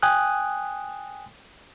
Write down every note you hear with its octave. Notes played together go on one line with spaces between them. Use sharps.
G5 G#5 D#6 F#6